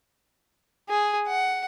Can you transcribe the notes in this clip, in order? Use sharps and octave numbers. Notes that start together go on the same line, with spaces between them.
G#4
F#5